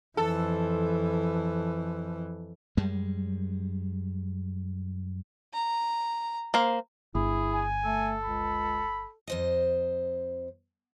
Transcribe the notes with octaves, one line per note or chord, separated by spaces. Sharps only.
F2 E3 A4
F#2 G3 G#3
A#5
A#3 C5
G1 E4 G#4
G#5
A3 A4
C#2 B5
F2 C5 D#5